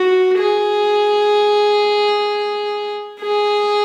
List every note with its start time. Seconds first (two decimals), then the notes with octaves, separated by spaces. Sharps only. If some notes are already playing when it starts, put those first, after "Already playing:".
Already playing: F#4
0.38 G#4
3.21 G#4